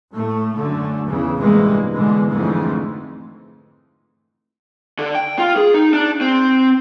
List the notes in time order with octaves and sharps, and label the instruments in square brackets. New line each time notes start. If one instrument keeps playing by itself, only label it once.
[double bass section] A2 A3
F#2 D3 A3
B1 E2 C#3 E3
A1 G2 C3 E3 G#3 A#3
G#2 B2 D3 E3 G#3
F2 G#2 D3 E3 G#3 A3
[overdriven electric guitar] D3
G5
F4
G#4
D#4
D4
C4